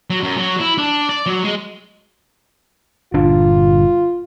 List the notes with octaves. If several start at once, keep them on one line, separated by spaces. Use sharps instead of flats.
F#3
F#2
F#3
E4
D4
D5
F#3
G#3
G1 A#2 D4 F4